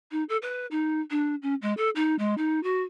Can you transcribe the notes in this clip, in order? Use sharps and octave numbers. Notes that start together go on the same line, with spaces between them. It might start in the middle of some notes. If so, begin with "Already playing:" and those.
D#4
A4
B4
D#4
D4
C#4
G#3
A4
D#4
G#3
D#4
F#4